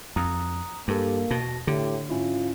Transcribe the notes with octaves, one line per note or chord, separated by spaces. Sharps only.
F2 A#5 D#6 F#6
G2 A#3 G4 A4
E2 B2 A5 A#6
A2 D3 G4
G#2 C#4 E4 F4